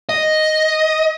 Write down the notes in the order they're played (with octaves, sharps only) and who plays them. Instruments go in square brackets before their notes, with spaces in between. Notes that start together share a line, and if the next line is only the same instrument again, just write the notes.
[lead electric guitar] D#5